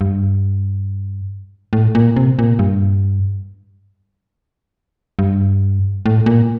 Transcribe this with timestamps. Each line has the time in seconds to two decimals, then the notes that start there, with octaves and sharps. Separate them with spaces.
0.01 G2
1.73 A2
1.95 A#2
2.16 C3
2.39 A#2
2.59 G2
5.19 G2
6.06 A2
6.26 A#2